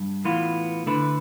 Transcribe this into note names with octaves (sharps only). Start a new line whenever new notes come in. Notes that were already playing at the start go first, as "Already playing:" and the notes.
Already playing: G2
A2 E3 B3 F4
D3 A3 E4 B4